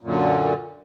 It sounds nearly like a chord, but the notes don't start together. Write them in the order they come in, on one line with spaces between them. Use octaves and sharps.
A#2 F#2 D3